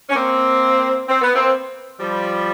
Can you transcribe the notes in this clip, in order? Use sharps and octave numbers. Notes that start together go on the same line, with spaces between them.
C#4
A#3 C4
C4
B3
A#3 C4
F3 G3